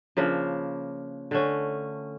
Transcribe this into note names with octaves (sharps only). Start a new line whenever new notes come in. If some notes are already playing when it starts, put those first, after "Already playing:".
C#3 F3 A#3 D4
D3 A3 C#4